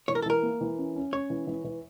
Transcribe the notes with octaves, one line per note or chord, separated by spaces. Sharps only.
E3 C#5
A#4
A4
E3 A#4
A#3
E3
C#4
C#4
C#4 C#5
E3
E3
E3